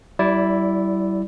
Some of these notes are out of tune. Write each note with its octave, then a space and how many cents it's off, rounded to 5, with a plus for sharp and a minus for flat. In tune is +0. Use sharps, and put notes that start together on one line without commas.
G3 -35 E4 +0 D5 -10